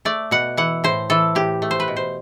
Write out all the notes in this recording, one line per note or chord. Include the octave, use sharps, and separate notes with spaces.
A3 D5
B2 F#5
E3 F#5
A2 C5
E3 A4
A2 G4
A3
C5
B4
B2
C5